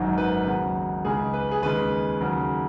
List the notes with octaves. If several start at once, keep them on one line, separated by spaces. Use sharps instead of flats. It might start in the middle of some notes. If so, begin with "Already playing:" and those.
Already playing: G#1 F#2 D#3 F#3
B4
D#2 C#3 F#3
C#2 C#3 G#3 G#4
B4
G#4
D#2 C#3 G#3 B4
D#2 C#3 F#3